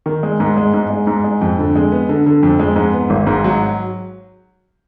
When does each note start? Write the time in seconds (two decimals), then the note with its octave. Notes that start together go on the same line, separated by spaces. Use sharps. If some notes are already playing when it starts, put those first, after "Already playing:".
0.06 D#3
0.23 G#3
0.40 G#2
0.57 G#3
0.73 G#2
0.90 G#3
1.07 G#2
1.24 G#3
1.41 F2
1.58 D3
1.76 G#3
1.92 B3
2.09 D3
2.26 D3
2.43 F2
2.59 G#3
2.76 G#2
2.93 B3
3.10 G#1
3.27 G#2
3.44 F#3